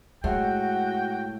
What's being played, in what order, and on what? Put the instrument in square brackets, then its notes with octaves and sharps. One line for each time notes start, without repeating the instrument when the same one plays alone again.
[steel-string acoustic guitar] A2 [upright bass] G#3 [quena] F#4 [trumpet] G5